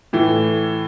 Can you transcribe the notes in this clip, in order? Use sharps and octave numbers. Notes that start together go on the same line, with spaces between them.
A2 E3